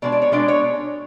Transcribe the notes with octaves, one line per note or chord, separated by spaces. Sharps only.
B2 G#3 D4 D5
D5
C#5
B2 G#3 D4 D5
C#5